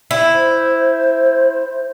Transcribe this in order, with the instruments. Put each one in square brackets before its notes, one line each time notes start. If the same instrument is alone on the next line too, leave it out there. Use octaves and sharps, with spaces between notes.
[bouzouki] E4
[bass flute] C5